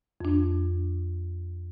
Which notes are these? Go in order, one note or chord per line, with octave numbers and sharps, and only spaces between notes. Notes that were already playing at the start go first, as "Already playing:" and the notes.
F2 D4